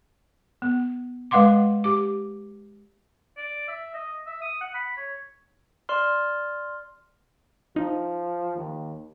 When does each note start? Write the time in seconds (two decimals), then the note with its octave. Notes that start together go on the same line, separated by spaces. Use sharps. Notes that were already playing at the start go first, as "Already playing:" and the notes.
0.62 B3
1.31 G#3 B4 F5 F#5 C6 D6
1.84 G4 D6
3.37 D5
3.68 E5
3.94 D#5
4.27 E5
4.42 D#6
4.61 F#5
4.74 B5
4.97 C#5
5.89 D5 C6 F6
7.76 F3 D#4
8.56 D#2